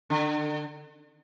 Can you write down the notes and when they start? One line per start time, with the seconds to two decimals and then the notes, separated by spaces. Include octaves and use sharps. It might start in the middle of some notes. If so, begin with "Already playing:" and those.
0.10 D3